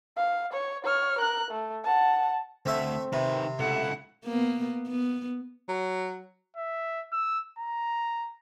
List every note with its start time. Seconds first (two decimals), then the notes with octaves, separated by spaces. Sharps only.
0.17 F5
0.53 C#5
0.84 C#5 F6
1.19 A#4 F#6
1.51 A3
1.84 F#5 A5
2.66 D2 A3 C4 E5
3.13 C3 D#3 B4
3.59 C#2 A3 E4 F#5
4.25 A#3 B3
4.87 B3
5.68 F#3
6.57 E5
7.12 E6
7.58 A#5